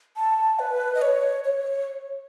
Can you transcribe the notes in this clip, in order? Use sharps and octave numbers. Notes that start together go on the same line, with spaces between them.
A5
B4
D#5
C#5
C#5